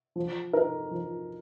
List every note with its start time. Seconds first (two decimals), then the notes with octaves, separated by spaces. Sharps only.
0.16 F3
0.53 D#4 A#4
0.91 F3